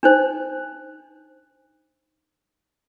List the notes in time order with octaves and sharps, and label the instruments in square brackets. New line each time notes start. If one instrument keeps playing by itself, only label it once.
[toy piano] D4 D#4 C5